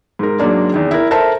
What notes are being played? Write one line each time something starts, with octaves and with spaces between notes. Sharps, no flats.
G#2 A#4
G#2 F#3 G#3 A#3 D4
E2 D#3
E4 A#4
A4 A#4 C5 E5 A5